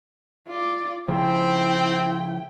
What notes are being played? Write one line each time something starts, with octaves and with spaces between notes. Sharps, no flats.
F4 D5
C#3 F3 C4 E4 G5